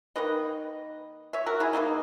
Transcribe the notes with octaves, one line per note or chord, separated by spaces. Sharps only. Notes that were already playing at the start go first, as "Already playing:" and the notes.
D#3 A#3 D#4 B4 D#5
C#5 E5
F#4 A#4
E4 G#4
B2 F#3 A#3 D#4